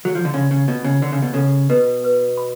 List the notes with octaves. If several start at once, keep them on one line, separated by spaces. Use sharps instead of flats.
F#3
F3
D3
C#3 F5
C#3
B2 F4
C#3
D3 C#5
C#3
B2
C#3 A4
B2 B4
B4
B5